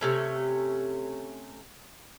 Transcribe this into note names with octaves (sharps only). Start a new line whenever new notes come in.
C3 A3 C#4